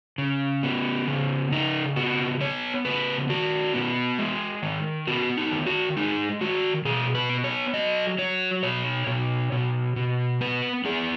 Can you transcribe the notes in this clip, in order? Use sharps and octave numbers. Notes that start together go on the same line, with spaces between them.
C#3
B3
C#3
C#3 D#4
B3 F#4
B3 C#5
C#3 B4
D#3 F#4
B3
G#3
D#3
B3 F#4
D#4
D#3
F#4
G#3 D#4
D#3 F#4
B2 G#4
B4
B3
C#5
F#3 D#5
F#3 C#5
B2 C#5
B2
B2
B2
B3 B4
B3 G#4